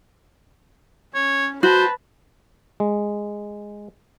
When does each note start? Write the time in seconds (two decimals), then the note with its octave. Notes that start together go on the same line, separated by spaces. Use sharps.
1.15 C#4 C#5
1.63 F#4 B4 C5 A5
2.80 G#3